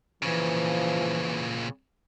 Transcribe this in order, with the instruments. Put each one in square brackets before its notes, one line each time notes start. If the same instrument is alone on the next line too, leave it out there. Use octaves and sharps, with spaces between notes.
[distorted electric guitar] A#2 C#3 [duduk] E3 [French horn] F3